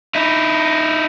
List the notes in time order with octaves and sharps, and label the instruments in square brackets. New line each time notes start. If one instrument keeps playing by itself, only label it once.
[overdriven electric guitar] D#4 E4